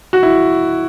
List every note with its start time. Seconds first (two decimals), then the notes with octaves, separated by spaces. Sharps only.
0.13 F#4
0.23 E4